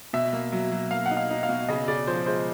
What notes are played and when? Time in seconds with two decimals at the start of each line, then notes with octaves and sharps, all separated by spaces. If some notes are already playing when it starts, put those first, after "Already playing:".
0.13 B2 E5
0.33 A#3
0.52 F#3
0.71 F#3
0.91 A#3 F5
1.06 F#5
1.11 D#4
1.17 F5
1.30 D#4
1.43 F5
1.49 B2
1.69 C#3 D#5
1.88 C#3 D5
2.07 F3 C5
2.26 G#3 C5